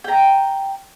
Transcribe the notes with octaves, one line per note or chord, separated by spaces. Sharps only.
G5 A#5